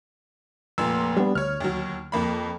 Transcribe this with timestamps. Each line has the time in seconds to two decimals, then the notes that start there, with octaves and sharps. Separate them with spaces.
0.78 F1 A#2 E6
1.17 G3 B3 D4
1.35 D2 C#5 F6
1.61 D#2 F#3
2.12 F2 A#3 B5